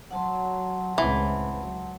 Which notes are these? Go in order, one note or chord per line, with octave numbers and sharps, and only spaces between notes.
F#3 F#5 A5 C6
C#2 A2 E3 C4
F#3